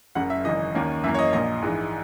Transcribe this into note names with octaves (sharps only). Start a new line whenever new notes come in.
F#1 F#2 C#3 F#5
E5
G#1 F#2 C#3 E3 D#5
D#2 D#3 A#3 C#4
F#2 E3 A#3 E5
C#5
D#5
A#1 A#2 A#3 D#5
A#1 G#2 E3 G#3